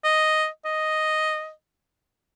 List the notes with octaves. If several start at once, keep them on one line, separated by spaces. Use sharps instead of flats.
D#5
D#5